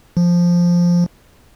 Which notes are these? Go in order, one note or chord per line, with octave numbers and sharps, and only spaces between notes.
F3